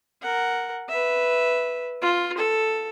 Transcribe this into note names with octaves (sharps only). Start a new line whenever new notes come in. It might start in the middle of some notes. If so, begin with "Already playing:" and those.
A#4 F#5
B4 E5
F4
A4